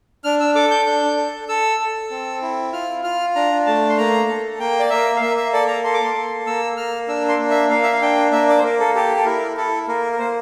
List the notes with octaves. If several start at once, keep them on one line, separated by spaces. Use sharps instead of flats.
D4 F6
E6
A4 D6
G6
D4 G6
A4
A4 E6
A4
C4
E4
F4 F6
F4 F6
D4 A#5
A3 A5
C6
A#3 A#5
A4
A#3 G5
D5
A#3 E5
F5
A#3 E5
E5
A4 D5
A#5
A4 C6
D6
C6
A#3
A#3 E6
A#3 F6
D4 E6
C6
A#3
E5
A#3 F5
E5
F5
D4 G5
A#3 E5
D5
C5
A#3 A#4
A4
G4 A4
A4
E4 A#4
E4 A4
A#3 A#4
A#4
A#3 C5